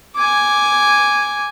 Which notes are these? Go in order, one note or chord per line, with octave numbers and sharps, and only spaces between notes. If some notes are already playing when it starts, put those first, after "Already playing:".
G#5 D6